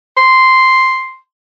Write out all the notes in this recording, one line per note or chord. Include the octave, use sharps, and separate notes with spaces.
C6